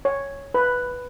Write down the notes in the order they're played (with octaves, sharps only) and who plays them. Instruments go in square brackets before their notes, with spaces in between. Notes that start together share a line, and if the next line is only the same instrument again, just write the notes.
[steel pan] C#5
B4